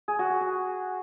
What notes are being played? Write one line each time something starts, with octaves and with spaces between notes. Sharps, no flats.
G#4
F#4
G#4
G#4